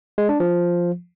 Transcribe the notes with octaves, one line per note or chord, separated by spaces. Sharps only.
G#3
D4
F3